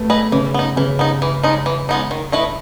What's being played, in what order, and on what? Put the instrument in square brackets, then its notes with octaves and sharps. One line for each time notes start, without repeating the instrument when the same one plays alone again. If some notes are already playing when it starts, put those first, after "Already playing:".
Already playing: [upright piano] A3 B3
[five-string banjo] G#4 B4 D#5
[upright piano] C#3 C#4 [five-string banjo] E3
[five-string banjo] B3 D#4
[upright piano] C#3 C#4 [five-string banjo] E3
[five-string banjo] B3 D#4
E3
G#3 B3 D#4
E3
G#3 B3 D#4
D#3
A3 E4 B4 D#5